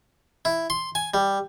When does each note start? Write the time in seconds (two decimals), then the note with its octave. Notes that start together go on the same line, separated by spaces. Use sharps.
0.45 E4
0.70 C6
0.95 G#5
1.14 G3